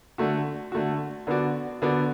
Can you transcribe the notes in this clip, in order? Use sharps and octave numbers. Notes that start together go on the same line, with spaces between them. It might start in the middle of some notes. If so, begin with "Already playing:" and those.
D3 A3 F#4
D3 A3 F#4
D3 B3 F#4 D5
D3 B3 F#4 D5